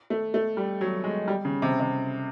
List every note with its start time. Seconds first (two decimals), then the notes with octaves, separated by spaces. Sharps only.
0.10 A3
0.34 A3
0.57 G3
0.81 F#3
1.04 G#3
1.28 G3
1.45 C#3
1.62 C3
1.80 C3